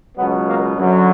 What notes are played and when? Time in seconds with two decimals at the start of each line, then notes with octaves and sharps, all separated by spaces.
0.17 C#2 B2 F#3 B3
0.46 A#3
0.76 F#2 D3 F#3